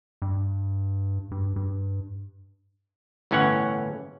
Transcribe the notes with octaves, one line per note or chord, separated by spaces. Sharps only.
G2
G2
G2
G1 A2 E3 C#4 C#5 F#5